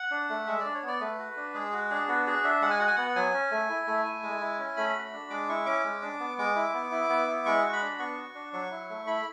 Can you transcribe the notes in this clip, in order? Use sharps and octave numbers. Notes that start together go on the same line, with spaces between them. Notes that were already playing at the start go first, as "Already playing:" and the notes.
Already playing: F#5
D4
A3
G#3 E5
D5
D4
C#5
B3
D5
A3 B4
F#4
D4
G#3 G#4
F#4
D4 G#4
B3 F#4
F#4 G#4
D4 E5
G#3 F#5
G#5
F#4 F#5
G#5
B3 F#5
F#3 G#5
C#4
A3
E4
A3
E4
G#3
E4
C#4
A3 B5
F#4
D4
G#3 D6
E4 C#6
C#4 D6
G#3
D4
B3
G#3 D6
E4
B3
E4
B3
E4
G#3 C#6
F#4
B5
D4
B3 C#6
F#4
D4
F#3 C#6
E4
A3
E4 B5